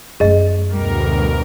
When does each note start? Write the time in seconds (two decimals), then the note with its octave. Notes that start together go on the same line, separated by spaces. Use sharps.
0.20 F#2 A3 G#4 D#5
0.71 D2 B2 G3 A#4